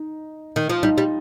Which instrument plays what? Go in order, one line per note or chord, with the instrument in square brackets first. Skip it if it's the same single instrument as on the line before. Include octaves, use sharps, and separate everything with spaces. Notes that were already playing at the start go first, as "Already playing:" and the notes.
Already playing: [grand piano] D#4
[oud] D#3
F3
[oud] G3 [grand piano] D#4
[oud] G3